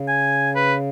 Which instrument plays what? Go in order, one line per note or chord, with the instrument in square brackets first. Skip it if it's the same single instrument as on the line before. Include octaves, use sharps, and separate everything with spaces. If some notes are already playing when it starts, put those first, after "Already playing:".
Already playing: [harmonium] C#3
[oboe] G#5
B4